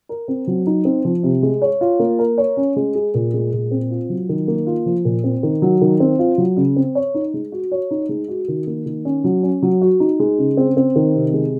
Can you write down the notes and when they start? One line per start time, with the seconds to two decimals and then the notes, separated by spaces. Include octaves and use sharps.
0.09 A#4
0.28 C4
0.47 F#3
0.67 D#4
0.85 C4
1.05 F3
1.23 C3
1.43 G#3
1.62 C#5
1.81 F4
1.99 A#3
2.19 A#4
2.38 C#5
2.57 C#4
2.76 G#3
2.95 G#4
3.14 A#2
3.34 G#3
3.53 A#2
3.71 C4
3.91 F4
4.10 F#3
4.29 D#3
4.48 A#3
4.67 F4
4.86 F3
5.05 A#2
5.24 C4
5.43 D#3
5.62 F#3
5.81 D#3
6.00 C4
6.19 F4
6.38 F#3
6.57 C#3
6.76 C4
6.95 C#5
7.14 D#4
7.34 G#3
7.52 F#4
7.72 C#5
7.91 D#4
8.09 G#3
8.28 F#4
8.48 D#3
8.67 A#3
8.86 D#3
9.05 C#4
9.24 F#3
9.43 C#4
9.62 F#3
9.81 F#4
10.00 D#4
10.20 G#3
10.38 C#3
10.57 C4
10.77 C4
10.95 D#3
11.15 C3
11.33 G#3